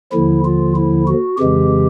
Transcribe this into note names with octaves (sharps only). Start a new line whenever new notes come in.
D#2 D3 F3 E4
F4
E4
F#4
F2 C#3 E3 G#3 G4